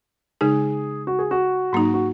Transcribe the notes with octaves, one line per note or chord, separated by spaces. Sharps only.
C#3 G#3 D#4 G#4
F#4
G#4
F#4
G#2 F#3 A#3 D#4
F#4